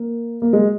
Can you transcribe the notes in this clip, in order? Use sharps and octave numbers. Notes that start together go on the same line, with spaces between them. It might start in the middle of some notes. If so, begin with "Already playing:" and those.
Already playing: A#3
A#3
G#3